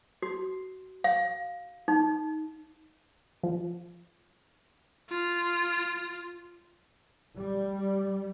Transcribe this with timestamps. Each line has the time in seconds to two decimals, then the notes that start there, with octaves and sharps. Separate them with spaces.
0.22 F#4
1.04 F5
1.88 D#4
3.43 F3
5.10 F4
7.37 G3